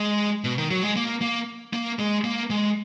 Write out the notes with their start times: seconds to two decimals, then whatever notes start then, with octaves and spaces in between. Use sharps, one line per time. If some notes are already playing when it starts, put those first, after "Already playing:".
Already playing: G#3
0.44 B2
0.58 D#3
0.71 F#3
0.83 G#3
0.96 A#3
1.21 A#3
1.73 A#3
1.99 G#3
2.24 A#3
2.50 G#3